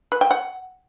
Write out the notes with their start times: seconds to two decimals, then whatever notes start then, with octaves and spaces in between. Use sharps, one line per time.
0.12 B4
0.21 G5
0.31 F#5